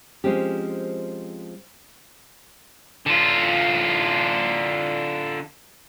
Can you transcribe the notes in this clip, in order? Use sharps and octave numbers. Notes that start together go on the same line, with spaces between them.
F3 G#3 C4 C#4 G4
D3 F4